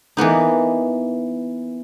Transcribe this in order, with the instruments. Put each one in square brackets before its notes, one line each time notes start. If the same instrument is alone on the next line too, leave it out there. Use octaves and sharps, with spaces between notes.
[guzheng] E3 A#3 B3 D#4